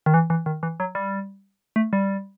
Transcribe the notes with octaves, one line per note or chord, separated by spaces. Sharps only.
D#3
E3
E3
D#3
E3
F#3
G3
A3
G3